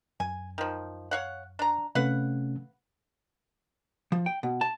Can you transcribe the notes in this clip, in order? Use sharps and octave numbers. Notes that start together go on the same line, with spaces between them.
F#2 G#5
D#3 F3
C#5 F5 F#5
D4 A#5
C3 A3 C#4 B4 F5 F#5
F3
G5
B2
A5